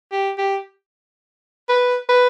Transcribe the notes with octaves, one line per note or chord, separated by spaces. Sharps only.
G4
G4
B4
B4